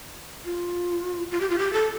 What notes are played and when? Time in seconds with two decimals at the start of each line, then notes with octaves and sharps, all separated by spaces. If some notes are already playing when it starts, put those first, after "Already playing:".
0.45 F4
1.31 F4
1.40 G4
1.50 F4
1.59 G4
1.73 A4